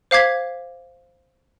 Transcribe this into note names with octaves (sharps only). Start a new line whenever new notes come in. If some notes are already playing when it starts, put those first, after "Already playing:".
C5 F5 D6 G#6 B6